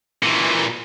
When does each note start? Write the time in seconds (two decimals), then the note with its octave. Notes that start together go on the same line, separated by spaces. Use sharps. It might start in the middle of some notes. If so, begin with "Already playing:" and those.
0.23 A#2 E3